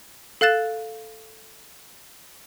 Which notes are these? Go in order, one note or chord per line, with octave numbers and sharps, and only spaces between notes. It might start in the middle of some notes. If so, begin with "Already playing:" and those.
A4 F5 F#6 A6 E7